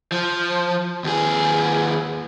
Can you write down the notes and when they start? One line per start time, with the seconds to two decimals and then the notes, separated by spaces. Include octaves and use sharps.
0.12 F3
1.04 D#2 G#4